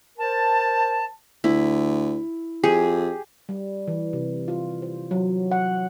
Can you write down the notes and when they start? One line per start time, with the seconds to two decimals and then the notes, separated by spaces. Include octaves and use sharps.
0.18 A#4 C5 A5
1.44 D2 E4
2.64 F2 G4 G#4
3.49 G3
3.88 E3
4.13 C3
4.48 F4
4.82 C5
5.11 F#3
5.52 F#5